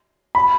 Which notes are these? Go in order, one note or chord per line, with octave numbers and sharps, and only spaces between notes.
B5